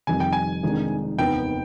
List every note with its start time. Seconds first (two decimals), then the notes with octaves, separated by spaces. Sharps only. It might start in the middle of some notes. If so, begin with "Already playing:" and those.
0.07 F1 F2 D#3 G3 G#5
0.20 G5
0.33 G#5
0.63 F1 F2 D#3 G#3 D4
1.18 F1 D#2 D#3 B3 G5